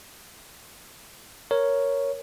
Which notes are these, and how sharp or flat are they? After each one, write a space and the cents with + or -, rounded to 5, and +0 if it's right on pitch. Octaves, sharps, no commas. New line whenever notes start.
A#4 +0 C#5 +0